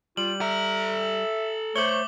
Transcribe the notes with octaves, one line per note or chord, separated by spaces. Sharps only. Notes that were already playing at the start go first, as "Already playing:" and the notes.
G3 F4 F#7
A4 E5 A#5
A3 C5 C#5 D6 F#7 G7